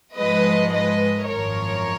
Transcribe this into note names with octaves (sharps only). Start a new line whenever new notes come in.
G#2 F3 G#3 B4 D#5
B4 D#5
G#1 F#2 F3 A#4 C#5